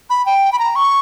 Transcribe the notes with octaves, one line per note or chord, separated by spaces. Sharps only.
B5
G5
B5
A#5
C#6